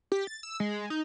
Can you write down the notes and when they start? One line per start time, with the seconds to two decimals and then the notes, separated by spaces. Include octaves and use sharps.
0.12 G4
0.27 A6
0.43 E6
0.60 G#3
0.90 D#4